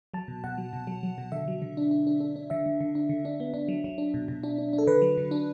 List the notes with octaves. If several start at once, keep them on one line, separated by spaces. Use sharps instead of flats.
F#3 A5
B2
B2 F#5
F#3
B2
F#3
F#3
B2
D3 E5
F#3
D3
D4
D4
D4
D4
D4
D3 E5
D3
D3
D4
D3
D4
B3
D4
F#3
F#3
D4
B2
B2
D4
D4
D4
A4
D3 B4
F#3
D3
D4